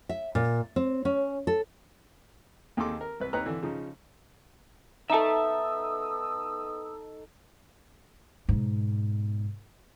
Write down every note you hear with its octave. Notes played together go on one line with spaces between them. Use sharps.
E5
A#2
C4
C#4
A4
D#2 D#4 G#4 A4 C6 D6
A#4
C2 B4
D#2 D#4 B4 C#5 A#5 F#6
D3 E3
C#3 F3 D#4
B3 D#4 A4 E5 A5 D#6 E6
G#2 B2